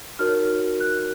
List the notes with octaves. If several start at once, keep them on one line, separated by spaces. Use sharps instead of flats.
D#4 F#4 A#4 C#5 F6
F#6